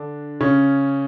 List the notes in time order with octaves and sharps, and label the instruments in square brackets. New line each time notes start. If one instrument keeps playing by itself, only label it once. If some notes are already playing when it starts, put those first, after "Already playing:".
Already playing: [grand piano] D3 D4
C#3 C#4